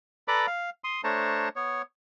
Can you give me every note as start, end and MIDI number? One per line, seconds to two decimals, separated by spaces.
0.28 0.46 69
0.28 0.46 71
0.28 0.46 74
0.28 0.46 82
0.28 0.46 83
0.28 0.46 86
0.47 0.70 77
0.84 1.01 84
0.84 1.01 87
1.04 1.49 57
1.04 1.49 62
1.04 1.49 72
1.04 1.49 73
1.04 1.49 81
1.04 1.49 82
1.56 1.82 59
1.56 1.82 73